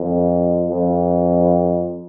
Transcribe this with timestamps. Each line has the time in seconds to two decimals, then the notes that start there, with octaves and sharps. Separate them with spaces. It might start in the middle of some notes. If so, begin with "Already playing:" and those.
Already playing: F2
0.68 F2